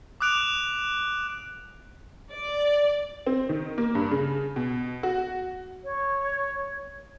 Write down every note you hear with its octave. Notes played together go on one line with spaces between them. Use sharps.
D6 D#6 F#6 D7 F7
D5
C4
D#3
A#3
G2
C#3
B2
F#4
C#5